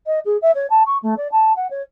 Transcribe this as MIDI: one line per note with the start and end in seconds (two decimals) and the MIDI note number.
0.06 0.19 75
0.25 0.37 68
0.42 0.51 76
0.55 0.67 73
0.70 0.83 81
0.86 0.98 85
1.03 1.14 57
1.17 1.28 74
1.32 1.55 81
1.56 1.67 78
1.70 1.82 73